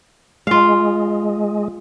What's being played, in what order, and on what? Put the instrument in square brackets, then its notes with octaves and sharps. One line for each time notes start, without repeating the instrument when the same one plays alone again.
[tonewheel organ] G#3 [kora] F4 F5